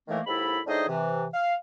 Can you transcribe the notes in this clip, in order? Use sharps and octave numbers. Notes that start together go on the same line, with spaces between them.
A2 D#3 E3 A3 A#3
D#2 G#2 E4 A4 B5
A2 D4 D#4 G#4 C5 D#5
C3 E3
F5